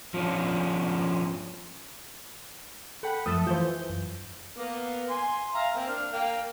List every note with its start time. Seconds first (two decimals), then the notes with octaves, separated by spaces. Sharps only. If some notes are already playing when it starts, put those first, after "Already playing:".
0.14 F3 C#4 D4
3.03 A4 F#5 G5 B5
3.26 F#2 F3 A3 A4 D#6
3.47 E3 F4 C5 G6
3.90 F#2
4.57 A#3 B3
5.09 G#5 C6
5.54 E5 F5 A#5
5.75 A#3 C4
5.88 D4 F6
6.13 A#3 F5 G5